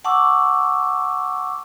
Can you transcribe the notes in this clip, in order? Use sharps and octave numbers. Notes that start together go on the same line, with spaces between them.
F#5 A5 C#6 D6 E6